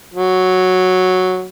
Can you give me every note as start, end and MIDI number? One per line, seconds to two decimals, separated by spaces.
0.14 1.48 54